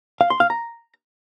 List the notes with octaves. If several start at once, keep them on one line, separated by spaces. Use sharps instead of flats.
F5
C6
F5
A#5